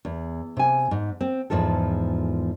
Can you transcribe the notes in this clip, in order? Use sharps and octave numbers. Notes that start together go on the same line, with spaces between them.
E2
C3 G#5
G#2
C4
E2 G#2 F3 F4 A4